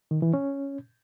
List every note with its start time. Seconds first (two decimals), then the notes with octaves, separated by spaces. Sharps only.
0.11 D#3
0.22 E3
0.34 C#4